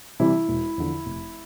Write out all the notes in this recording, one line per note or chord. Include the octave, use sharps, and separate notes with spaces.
C3 E3 G3 E4
E1
E2 D3 F3
F1